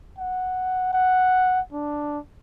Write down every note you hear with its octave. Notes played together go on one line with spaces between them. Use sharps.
F#5
F#5
D4